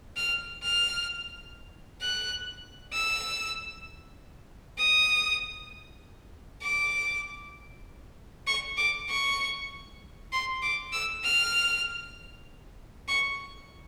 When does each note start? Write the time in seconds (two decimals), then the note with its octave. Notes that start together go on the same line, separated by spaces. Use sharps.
0.17 F6
0.63 F6
2.02 F#6
2.93 E6
4.79 D#6
6.62 D6
8.47 C#6
8.78 D6
9.09 C#6
10.32 C6
10.62 D6
10.93 E6
11.24 F6
13.08 C#6